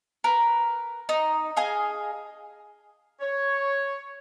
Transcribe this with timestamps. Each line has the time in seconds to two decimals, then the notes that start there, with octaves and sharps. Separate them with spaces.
0.24 A#4 B4
1.09 D#4
1.57 G#4 D#5 F5
3.21 C#5